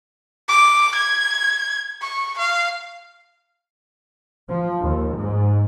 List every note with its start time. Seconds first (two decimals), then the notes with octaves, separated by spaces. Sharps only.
0.49 D6
0.95 G#6
2.02 C#6
2.39 F5
4.48 F3
4.80 D#2
5.19 G#2